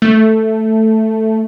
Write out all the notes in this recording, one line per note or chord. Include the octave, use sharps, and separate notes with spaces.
A3